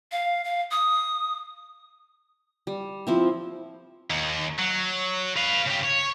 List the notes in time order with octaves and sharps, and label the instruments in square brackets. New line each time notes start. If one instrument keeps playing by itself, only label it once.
[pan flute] F5
F5
D#6
[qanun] G3
F3 C4 E4
[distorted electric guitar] D#2
F#3
B4 F5
C#3 G4
C#5